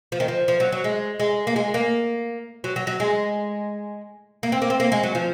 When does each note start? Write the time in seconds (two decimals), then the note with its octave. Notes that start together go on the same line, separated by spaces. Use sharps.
0.12 F3
0.20 D#3
0.28 F3
0.48 F3
0.60 F#3
0.72 F#3
0.84 G#3
1.20 G#3
1.47 A#3
1.56 G#3
1.74 A#3
2.64 F#3
2.76 F#3
2.87 F#3
3.00 G#3
4.43 A#3
4.52 C4
4.62 A#3
4.70 C4
4.80 A#3
4.92 G#3
5.03 F#3
5.15 F3